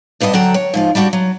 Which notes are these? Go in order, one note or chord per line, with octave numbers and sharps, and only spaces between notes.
G2 B3 D4 F4 D#5
D3 F#3 A4 F#5 G5 A#5
C#5
G#2 F3 F4
G3 D4 D#4 F#4 G4
F#3